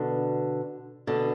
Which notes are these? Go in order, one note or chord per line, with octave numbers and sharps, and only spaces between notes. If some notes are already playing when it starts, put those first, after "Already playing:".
Already playing: B2 D3
B2 D3